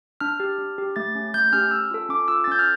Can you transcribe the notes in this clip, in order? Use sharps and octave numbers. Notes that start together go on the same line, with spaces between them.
D4 F6
G4
D4
G4
A3 A6
C#4 G4
A3 G6
C#4 G4 F6
C#4 E6
F4 A4
C#4 D6
F4 A4 E6
A6
C#4 G6
F6